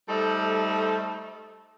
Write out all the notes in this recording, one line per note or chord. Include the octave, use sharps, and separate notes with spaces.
G3 A3 D#4 A4 C5